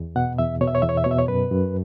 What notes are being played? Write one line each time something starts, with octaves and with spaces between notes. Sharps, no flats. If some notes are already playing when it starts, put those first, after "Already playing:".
Already playing: E2
B2 F#5
E2 E5
B2 C#5
E5
C#5
E2 E5
C#5
E5
B2 C#5
E5
C#5
F#2 B4
F#2